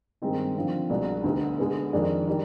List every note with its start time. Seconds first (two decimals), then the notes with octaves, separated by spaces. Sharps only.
0.22 G2 D#3 G#3 C4 D#4
0.55 D3 F3 C4
0.90 C2 B2 G#3 D4
1.24 D2 D3 G3 B3 D#4
1.59 D3 G#3 B3
1.93 F2 D#3 G#3 D4
2.27 D#3 G3 D4